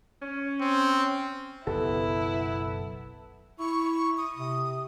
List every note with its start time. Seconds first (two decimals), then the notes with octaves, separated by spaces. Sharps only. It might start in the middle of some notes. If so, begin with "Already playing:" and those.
0.22 C#4
0.61 C4
1.67 F#1 B1 B3 E4 A4
3.59 E4 C#6
4.18 D#6
4.37 C3